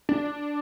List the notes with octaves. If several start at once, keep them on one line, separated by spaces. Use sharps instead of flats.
D4